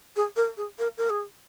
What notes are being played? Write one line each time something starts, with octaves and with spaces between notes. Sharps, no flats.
G#4
A#4
G#4
A#4
A#4
G#4